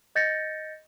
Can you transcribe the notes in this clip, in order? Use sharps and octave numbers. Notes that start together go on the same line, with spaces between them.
D#5 G6 A6 A#6 C#7